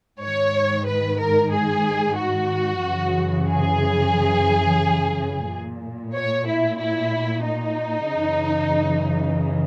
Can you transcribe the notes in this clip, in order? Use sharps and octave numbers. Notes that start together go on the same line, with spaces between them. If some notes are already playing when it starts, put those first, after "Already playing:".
G#2 D#3 C#5
B4
A#4
G#4
F#4
F#2 C#3 E3
G#4
A#2
C#5
E4
E4
D#4
F#2 C#3 E3